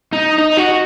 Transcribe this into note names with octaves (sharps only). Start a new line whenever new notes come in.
D#4
D#4
F#4